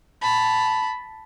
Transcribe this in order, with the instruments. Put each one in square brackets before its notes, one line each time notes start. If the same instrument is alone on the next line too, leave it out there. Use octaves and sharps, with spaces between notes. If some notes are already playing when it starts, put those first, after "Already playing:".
[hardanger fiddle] A5 B5